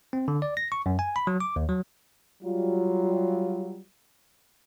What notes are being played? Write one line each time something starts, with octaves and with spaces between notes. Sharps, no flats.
C4
D3
D5
A#6
C#6
F#2
G#5
B5
F#3
D6
D#2
F#3
F#3 G3 F4